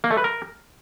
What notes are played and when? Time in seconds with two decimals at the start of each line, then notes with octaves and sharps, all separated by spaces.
0.04 A#3
0.11 A3
0.17 B4
0.24 A#4